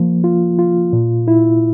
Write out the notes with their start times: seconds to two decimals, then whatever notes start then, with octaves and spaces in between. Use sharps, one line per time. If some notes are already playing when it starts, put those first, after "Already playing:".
Already playing: F3 A#3
0.24 F4
0.59 F4
0.93 A#2
1.28 E4